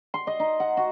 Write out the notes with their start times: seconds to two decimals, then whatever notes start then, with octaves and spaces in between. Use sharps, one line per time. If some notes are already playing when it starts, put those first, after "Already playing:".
0.14 C6
0.27 D#5
0.40 D#4
0.60 F#5
0.77 F#4